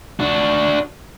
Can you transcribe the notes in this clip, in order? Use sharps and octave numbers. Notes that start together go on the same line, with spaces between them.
D4 F#4